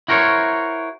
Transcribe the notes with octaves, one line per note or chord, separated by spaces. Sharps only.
E4 F#4 A#4 C5 C#5